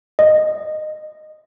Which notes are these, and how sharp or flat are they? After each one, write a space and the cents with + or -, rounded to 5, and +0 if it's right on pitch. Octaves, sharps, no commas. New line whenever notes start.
D#5 -15